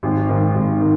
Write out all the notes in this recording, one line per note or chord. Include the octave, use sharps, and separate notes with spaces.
G#1
G#2 D#3
G#1
D#3